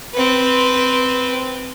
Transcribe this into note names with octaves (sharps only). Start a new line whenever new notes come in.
C4 B4